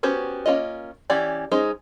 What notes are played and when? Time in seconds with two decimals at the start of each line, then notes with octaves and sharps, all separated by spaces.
0.03 B3 C#4 F#4 G4 C5
0.46 A#3 C#4 F4 D#5
1.10 E3 C#4 G4 D5 F#5
1.52 G#3 C#4 D#4 C5 D#5